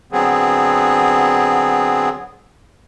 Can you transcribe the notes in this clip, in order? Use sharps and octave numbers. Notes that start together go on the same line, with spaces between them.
D3 F#3 B3 C4 G#4